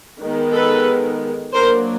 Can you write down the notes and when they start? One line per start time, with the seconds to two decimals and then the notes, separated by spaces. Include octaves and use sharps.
0.21 D#3 G#3 B3
0.54 A4 B4
1.55 F#3 A#3 D4 A#4 C5